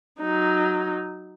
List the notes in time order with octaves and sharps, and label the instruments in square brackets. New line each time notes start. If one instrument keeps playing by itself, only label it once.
[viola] F#3 D#4